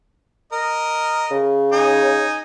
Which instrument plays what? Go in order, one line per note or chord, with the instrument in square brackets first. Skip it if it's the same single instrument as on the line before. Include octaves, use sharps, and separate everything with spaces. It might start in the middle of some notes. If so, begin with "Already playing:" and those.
[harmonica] A#4 D#5
[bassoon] C#3
[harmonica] D#4 G#5